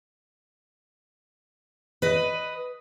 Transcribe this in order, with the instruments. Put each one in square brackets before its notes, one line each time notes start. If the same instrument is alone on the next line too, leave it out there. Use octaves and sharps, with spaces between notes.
[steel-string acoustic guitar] B4 D#5